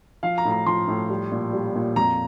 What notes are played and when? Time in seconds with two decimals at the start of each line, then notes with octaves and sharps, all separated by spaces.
0.23 F3 F5
0.38 A#5
0.45 A2
0.51 A#5
0.66 F3 C6
0.88 A2
1.10 G3
1.32 A#2
1.53 G3
1.75 A#2
1.96 F2 A#5